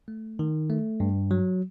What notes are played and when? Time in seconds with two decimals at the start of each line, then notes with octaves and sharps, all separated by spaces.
0.08 A3
0.39 D#3
0.70 A3
1.00 G2
1.31 F#3